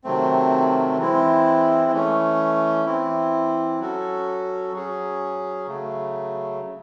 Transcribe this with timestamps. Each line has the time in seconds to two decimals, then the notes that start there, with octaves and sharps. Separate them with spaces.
0.04 C3 D#3 F#3 A3 C4
0.98 E3 G#3 C4 E4
1.91 E3 A3 C#4
2.86 E3 C4 E4
3.79 F#3 C#4 F#4 A4
4.73 F#3 C#4 G#4
5.67 C#3 F#3 A3